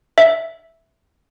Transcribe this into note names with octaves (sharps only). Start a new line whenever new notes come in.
E5